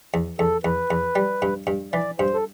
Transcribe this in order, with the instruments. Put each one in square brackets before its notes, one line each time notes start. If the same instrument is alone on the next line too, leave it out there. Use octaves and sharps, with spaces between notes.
[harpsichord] E2
[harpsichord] E2 [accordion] A4
[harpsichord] E2 [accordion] B4
[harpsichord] E2
G3
G2
G2
[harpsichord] E3 [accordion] D5
[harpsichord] G2 [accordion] C5
[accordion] A4